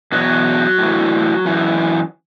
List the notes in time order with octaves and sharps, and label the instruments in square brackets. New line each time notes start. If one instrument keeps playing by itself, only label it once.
[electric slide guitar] E2 B2 F#3 F#4
A2 E3
F#2 E3